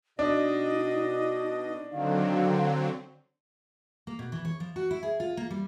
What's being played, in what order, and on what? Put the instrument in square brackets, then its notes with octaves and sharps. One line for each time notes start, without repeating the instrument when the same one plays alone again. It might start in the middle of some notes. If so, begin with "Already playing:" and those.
[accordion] B2 D#5 [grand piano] D4 [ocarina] D#4
[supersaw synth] D3 F#3 C4 [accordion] D#3 [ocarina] F5
[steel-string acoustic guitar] A#3
B2
E3
C#5
F3
F#4
E4
G#4
F4
A#3
G3